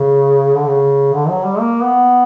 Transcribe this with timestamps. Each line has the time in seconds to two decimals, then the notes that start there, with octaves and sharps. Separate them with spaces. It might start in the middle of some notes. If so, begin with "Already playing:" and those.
Already playing: C#3
0.56 D3
0.68 C#3
1.13 D3
1.29 F#3
1.45 G3
1.59 A#3
1.83 B3